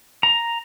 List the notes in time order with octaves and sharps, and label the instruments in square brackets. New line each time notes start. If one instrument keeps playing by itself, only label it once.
[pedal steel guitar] A#5